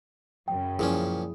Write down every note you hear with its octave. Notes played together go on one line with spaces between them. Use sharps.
F#2 C#3 G5
A#2 F3 C#4 E4 G#4